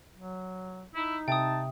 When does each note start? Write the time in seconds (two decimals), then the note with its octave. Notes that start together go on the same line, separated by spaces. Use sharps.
0.15 F#3
0.95 D#4 E4
1.28 C3 E5 G5 A5 D#6